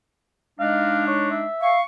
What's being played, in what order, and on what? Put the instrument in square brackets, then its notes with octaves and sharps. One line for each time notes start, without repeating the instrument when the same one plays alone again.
[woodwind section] G#3 D4 D#4 [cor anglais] F5
[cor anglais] C#5
E5
[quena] F5 [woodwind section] C#6